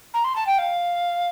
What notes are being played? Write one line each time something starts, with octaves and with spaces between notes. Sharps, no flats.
A#5
C6
A5
G5
F5